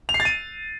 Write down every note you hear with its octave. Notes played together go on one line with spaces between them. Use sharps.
F7
C7
A6
D#7